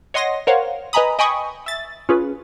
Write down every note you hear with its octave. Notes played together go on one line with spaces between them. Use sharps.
C#5 D#5 F#5 C6 D#6 A#6
A#4 C5 C#5 F5 F#5
B4 D#5 G#5 A#5 B5 D#6
D#5 G5 G#5 B5 C#6 D#6
E5 A6
C#4 F4 G#4 B4